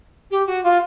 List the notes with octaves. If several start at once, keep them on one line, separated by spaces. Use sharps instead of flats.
G4
F#4
F4